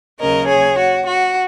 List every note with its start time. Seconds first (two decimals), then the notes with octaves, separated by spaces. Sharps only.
0.20 D#2 C#3 F#3 A#3 C#4 A#4 D#5
0.48 G#4 C#5
0.78 F#4
1.07 F#4